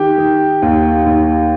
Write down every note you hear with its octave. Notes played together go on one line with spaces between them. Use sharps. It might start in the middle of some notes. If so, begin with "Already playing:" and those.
Already playing: D#3 G4
D#3
D#2
D#2